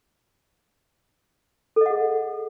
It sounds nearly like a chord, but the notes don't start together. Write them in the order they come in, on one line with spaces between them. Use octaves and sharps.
A4 D#5 F#5 G#4